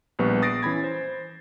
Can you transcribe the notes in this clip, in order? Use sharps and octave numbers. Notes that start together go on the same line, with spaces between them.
A#1 G3 B3 B4 C#6
D#6 A6 A#6 C7 D7
E3 C#4 B5 G#6
C5